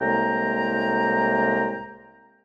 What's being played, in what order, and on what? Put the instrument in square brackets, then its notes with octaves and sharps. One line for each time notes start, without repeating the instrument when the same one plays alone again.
[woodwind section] C2 A2 G#3 A#3 G5 A#5